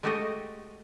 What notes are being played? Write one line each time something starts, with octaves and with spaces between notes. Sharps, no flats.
G#3 A3 F#4 G4 A4 D#5